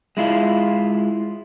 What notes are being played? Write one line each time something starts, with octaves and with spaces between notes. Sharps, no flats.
G#3 E4 F4